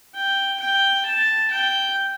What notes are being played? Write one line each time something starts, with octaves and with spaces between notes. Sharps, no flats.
G5
G5
A5
G5